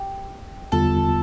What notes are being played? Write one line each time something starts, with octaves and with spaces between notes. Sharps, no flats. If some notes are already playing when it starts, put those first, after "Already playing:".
Already playing: G4
E2 D3 G3 B3 F4 A4